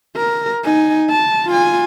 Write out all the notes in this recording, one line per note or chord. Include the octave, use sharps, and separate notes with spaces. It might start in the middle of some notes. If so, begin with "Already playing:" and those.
A#4
D#4 G#5
A5
F4 G#5